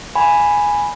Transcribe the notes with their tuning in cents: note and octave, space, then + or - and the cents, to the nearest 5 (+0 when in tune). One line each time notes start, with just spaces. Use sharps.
G#5 -5 B5 +0